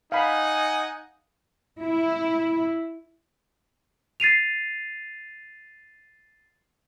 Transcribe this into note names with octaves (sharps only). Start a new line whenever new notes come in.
D#4 F5 F#5 G#5 B5
E4
A6 C7 D#7 F7